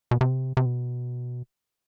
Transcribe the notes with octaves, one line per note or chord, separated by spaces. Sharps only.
B2
C3
C3
B2